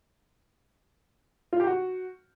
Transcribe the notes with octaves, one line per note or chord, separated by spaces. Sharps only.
F4
G4
F#4